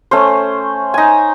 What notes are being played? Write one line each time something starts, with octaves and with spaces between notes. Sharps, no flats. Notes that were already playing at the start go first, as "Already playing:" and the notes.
A3 C#4 C5
D#4 G#5